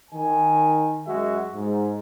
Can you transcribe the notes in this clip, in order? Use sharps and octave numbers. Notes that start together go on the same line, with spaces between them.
D#3 G#5
F#2 G#3 F#4 E5
G#2